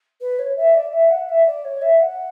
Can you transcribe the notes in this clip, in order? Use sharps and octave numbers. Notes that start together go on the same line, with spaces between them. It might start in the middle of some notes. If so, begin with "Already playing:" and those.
B4
C#5
E5
D5
E5
F#5
E5
D5
C#5
E5
F#5